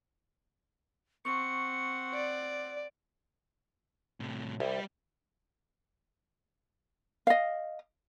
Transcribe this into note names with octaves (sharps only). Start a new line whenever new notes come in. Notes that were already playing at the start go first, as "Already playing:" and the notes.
C4 F#5 C#6 C#7
D5
A2 C3
C2 G3 G4
D#5 F5